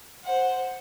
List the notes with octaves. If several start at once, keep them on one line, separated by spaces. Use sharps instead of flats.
C5 F#5